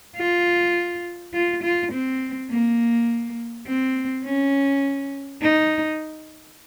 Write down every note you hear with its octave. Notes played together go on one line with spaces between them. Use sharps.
F4
F4
F4
C4
A#3
C4
C#4
D#4